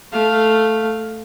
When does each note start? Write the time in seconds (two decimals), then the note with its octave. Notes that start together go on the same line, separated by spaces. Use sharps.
0.12 A3 F5